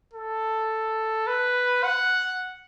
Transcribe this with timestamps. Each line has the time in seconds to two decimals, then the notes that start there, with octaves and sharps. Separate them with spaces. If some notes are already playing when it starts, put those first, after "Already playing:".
0.14 A4
1.27 B4
1.84 F#5